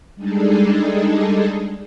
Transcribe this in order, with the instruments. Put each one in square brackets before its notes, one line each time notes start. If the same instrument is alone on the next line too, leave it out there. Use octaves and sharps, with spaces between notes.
[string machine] G3 G#3 D4 D#4 G#4 A4